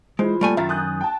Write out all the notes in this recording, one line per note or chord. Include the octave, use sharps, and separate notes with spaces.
E3 G#3 F4 C5 B5
A#2 G3 A3 G#5
F#2 D#3 E5 A6
G#5 D#6 F#6 G6
G5 A5